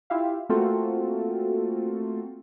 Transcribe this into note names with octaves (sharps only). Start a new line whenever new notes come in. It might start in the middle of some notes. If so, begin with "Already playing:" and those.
E4 F4 G4 E5 F5
A3 A#3 C4 F4 F#4 A4